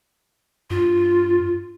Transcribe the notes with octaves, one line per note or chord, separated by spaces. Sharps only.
G2 F4